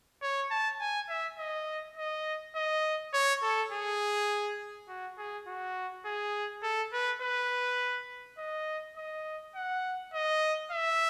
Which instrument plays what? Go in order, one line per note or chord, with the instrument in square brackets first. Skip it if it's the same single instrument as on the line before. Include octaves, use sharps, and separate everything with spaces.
[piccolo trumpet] C#5
A5
G#5
E5
D#5
D#5
D#5
C#5
A4
G#4
F#4
G#4
F#4
G#4
A4
B4
B4
D#5
D#5
F#5
D#5
E5